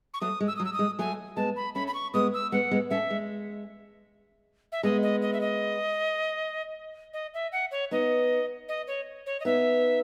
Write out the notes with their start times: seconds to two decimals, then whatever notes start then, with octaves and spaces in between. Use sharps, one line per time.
0.14 C#6
0.21 F#3 A3 D#6
0.40 G#3
0.47 E6
0.56 F#3 D#6
0.65 E6
0.73 D#6
0.79 G#3
0.99 F#3 A3 G#5
1.36 G#3 B3 A5
1.56 B5
1.75 A3 C#4 B5
1.88 B5
1.94 C#6
2.14 G#3 B3 D#6
2.34 E6
2.52 G#3 B3 F#5
2.71 G#3 B3
2.90 A3 C#4 E5
3.10 G#3
4.72 E5
4.83 G#3 B3 D#5
5.03 D#5
5.22 D#5
5.33 E5
5.41 D#5
7.14 D#5
7.34 E5
7.52 F#5
7.71 C#5
7.91 B3 D#4 D#5
8.69 D#5
8.87 C#5
9.26 C#5
9.40 D#5
9.45 B3 D#4 E5